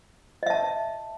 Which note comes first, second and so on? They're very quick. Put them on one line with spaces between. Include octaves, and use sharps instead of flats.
D#5 E5 A5